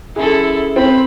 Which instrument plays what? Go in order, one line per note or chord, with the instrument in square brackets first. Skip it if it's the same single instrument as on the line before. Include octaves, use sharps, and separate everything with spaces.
[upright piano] F#2 G#4 [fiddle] E4 A4
[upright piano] C4 [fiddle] B5